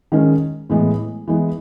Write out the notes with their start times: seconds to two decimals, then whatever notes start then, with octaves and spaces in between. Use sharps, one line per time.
0.12 D#3 G#3 C#4
0.69 A2 E3 G#3 B3
1.28 E3 G#3 B3